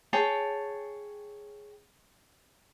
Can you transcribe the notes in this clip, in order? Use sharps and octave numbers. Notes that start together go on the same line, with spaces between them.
G#4 C#5 G5 A5